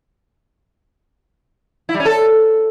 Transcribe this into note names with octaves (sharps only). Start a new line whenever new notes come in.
E4
G3
C#4
A4